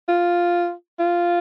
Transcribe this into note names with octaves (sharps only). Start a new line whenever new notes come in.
F4
F4